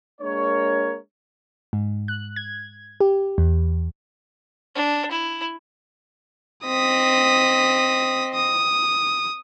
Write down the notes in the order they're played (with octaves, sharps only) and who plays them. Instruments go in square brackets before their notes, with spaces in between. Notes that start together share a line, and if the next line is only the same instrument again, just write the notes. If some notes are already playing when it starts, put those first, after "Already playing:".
[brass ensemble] G#3 A#3 D4 A#4 C#5
[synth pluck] G#2
F#6
G#6
G4
E2
[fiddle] D4
E4
[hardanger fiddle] C4 D#5 [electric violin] D#6 B6
[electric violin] D#6